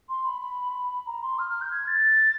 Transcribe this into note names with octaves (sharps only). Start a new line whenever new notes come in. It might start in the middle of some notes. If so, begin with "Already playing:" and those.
C6
B5
B5
A#5
C6
F6
F6
G6
G#6
A6